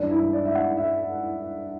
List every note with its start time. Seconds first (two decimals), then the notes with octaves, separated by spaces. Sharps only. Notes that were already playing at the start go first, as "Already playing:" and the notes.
Already playing: G2 E3 D4
0.11 E4
0.33 D5
0.45 E5
0.55 F#5
0.77 E5